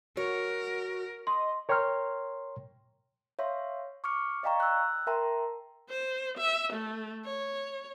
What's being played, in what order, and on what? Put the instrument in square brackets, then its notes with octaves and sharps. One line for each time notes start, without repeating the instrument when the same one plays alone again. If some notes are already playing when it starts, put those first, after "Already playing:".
[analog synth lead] F#4 [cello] A#4 [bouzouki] C#5
[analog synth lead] D#5 [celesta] C6
[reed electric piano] A#4 C#5 G5 A#5 C6 F6
[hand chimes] C#5 E5 F5 C6
C#6 D6 F6 C#7
D5 D#5 F5 G5 A#5 C#6
E6 F#6
A#4 E5 G5 A5 A#5 C6
[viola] C5
E5
A3
C#5